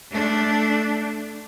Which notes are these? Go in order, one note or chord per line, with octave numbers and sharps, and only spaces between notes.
A3 D4